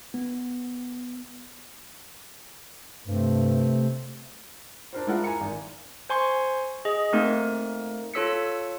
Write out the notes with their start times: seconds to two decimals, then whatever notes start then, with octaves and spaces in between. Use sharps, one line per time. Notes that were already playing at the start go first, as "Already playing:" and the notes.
0.14 B3
3.07 G2 C3 A3 C4
4.93 D4 A#4 C5
5.07 G#3 D4 E4 F4 A#4 F#5
5.24 G#5 A#5 C#7
5.41 G#1
6.10 C5 G#5 C6 C#6
6.85 G#4 D#5
7.13 A3 A#3 C4 D#4 A#4
8.14 F4 A4 C#5 E6 B6 C#7